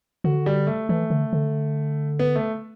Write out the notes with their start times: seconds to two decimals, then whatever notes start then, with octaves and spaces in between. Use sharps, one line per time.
0.24 D3 F#4
0.46 G3
0.67 A3
0.89 E3 A3
1.10 D3
1.33 D3
2.19 B3
2.36 A3